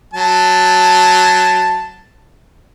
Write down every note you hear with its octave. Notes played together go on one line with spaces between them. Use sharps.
F#3 A5